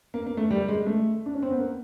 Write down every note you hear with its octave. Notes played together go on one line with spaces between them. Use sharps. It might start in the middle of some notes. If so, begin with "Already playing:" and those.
A#3
A#3
A3
G3
G#3
A3
D4
C#4
C4
B3
A#3